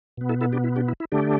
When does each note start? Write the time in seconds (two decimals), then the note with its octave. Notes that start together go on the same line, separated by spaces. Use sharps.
0.17 B2 B3
0.29 E4 A4
0.41 E4 A4
0.52 D4 G4
0.64 E4
0.76 D4 G4
0.88 E4
1.00 E4
1.12 D3 A3 D4 G4